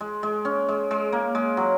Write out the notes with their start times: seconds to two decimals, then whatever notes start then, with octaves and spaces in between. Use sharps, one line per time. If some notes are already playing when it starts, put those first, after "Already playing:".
0.01 G#3
0.23 G#3
0.45 C#4
0.68 G#3
0.91 G#3
1.12 A#3
1.35 G#3
1.57 F#3